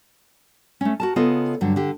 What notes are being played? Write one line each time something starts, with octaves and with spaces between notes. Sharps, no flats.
A3 C#4
F#4 A#4 A5
C#3 B3 F4 A4 D#5
G2 D3 F#3
D3 G4